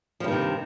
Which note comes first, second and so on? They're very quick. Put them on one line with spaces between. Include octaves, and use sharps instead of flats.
F3 G2 D#3 C3